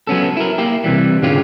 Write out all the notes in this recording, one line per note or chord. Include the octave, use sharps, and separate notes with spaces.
F#3 B3 C#4 A4
E4 A#4
A#3 E4 G4
C3 E3 G3
G#2 D3 G#3 C#4 F4 G4